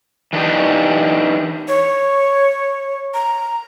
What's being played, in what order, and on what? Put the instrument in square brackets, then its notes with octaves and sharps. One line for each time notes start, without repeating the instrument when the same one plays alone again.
[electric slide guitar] E3 D4 D#4 G4
[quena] C#5
A#5